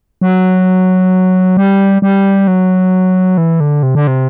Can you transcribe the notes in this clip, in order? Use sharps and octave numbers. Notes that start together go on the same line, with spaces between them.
F#3
G3
G3
F#3
E3
D3
C3
D3
C3